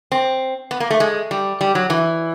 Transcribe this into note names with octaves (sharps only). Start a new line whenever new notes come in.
C4
B3
A#3
A3
G#3
G3
G3
F#3
E3